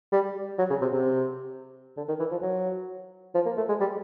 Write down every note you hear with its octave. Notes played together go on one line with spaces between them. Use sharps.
G3
F#3
C#3
C3
C3
D3
D#3
E3
F3
F#3
F3
A#3
A3
G#3
G3